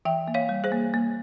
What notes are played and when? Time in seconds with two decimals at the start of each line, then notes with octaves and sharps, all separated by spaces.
0.05 E3 E5 G5
0.28 A#3
0.34 C#5 F5
0.49 G3
0.64 G#4 C5
0.72 A#3
0.94 A#3